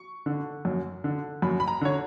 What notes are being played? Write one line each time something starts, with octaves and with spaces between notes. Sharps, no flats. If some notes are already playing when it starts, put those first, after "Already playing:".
Already playing: C#6
D3
F#2
D3
F#2 B5
B5
A#5
D3 C#5